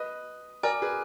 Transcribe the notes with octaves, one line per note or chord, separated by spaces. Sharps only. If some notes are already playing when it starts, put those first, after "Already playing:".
Already playing: B4 D#5 D#6
A#4 D5 G#5 D6 F6
G#4 B4